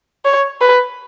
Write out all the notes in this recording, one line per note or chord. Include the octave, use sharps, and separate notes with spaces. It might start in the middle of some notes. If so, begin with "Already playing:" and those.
C#5
B4